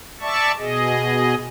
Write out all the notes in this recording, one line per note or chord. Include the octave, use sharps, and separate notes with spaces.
D5 E5 A5 C#6
B2 G#4 D#5